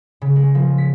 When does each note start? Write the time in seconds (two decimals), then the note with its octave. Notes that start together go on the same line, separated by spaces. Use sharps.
0.22 C#3
0.36 G#3
0.55 F3
0.78 B6